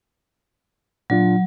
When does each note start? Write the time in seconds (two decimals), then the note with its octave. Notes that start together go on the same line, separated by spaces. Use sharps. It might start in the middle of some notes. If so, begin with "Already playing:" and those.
1.10 A#2 F#3 D4 F4